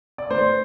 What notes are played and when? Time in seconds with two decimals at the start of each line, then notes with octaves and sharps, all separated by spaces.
0.18 D5
0.30 A3 C5